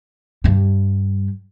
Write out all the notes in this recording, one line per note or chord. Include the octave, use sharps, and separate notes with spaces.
G2 G3